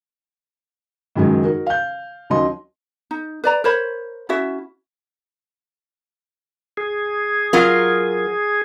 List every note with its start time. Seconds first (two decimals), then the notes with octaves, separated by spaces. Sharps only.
1.16 C#2 F#2 D#3 F#3 G#3
1.44 D#4 F#4 A#4
1.66 F5 G6
2.30 D#2 F#3 C#4 D#5 C6
3.11 D#4
3.44 B4 D5 A#5
3.64 A#4 C5 C#5 B5
4.29 C#4 E4 F#4 E5
6.77 G#4
7.53 F#3 F4 A#4